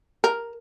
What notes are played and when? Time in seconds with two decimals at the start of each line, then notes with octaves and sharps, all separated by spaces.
0.24 A#4